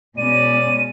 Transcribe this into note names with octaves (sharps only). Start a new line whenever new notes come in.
B2 G#3 C#4 D5 D#7